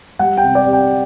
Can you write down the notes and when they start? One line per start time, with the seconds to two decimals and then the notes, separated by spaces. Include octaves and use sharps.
0.19 G3 F#5
0.37 G5
0.43 C3
0.55 D5
0.67 C3
0.73 G5